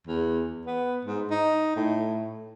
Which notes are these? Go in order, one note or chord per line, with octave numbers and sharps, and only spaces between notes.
E2
B3
G#2
D#4
A2